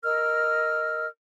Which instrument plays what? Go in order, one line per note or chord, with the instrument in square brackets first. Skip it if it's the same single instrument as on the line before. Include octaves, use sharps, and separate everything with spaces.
[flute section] A#4 D#5 E6 F6